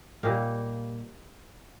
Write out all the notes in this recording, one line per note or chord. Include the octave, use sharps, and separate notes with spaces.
A#2 G3 A#3 D#4